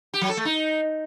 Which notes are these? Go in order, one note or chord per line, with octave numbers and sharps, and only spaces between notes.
G4
F#3
A4
A3
D#4